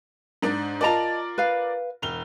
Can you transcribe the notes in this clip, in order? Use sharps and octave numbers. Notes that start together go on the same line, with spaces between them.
G#2 D4
F4 A#4 D5 D#5 A5 A#5
B4 F5
E1 F7 G7